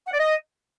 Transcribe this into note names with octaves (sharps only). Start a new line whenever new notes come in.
F#5
D5
D#5